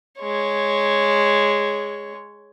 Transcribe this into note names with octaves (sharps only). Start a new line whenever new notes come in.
G#3 C#5